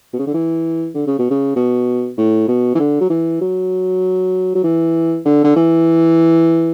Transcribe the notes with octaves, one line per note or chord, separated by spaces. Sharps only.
B2
C#3
D3
E3
D3
C#3
B2
C#3
B2
A2
B2
E3
D3
F#3
E3
F#3
F#3
E3
D3
D3
E3